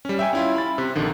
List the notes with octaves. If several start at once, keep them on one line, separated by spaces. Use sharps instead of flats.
G3 C#4
E5 G5 G#5
C#4 E4 F4
B5 A6
C3
A#1 D3 D#3